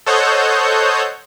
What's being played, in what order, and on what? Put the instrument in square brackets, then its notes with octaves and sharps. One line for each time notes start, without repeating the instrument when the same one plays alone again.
[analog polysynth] A4 C5 C#5 D#5 F#5 G6